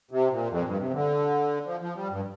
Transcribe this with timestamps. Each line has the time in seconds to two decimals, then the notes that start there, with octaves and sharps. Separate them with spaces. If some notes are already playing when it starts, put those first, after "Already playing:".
0.11 C3
0.31 A#2
0.50 F2
0.64 G2
0.79 C3
0.93 D3
1.66 F3
1.81 F3
1.95 G3
2.10 G2